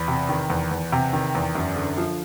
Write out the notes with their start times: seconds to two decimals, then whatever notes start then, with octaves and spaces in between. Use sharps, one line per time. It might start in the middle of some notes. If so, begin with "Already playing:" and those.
Already playing: E2 B5
0.08 C3
0.29 D#3
0.50 E2
0.71 E2
0.92 C3
1.13 D#3
1.35 E2
1.55 F#2
1.76 D3
1.98 F3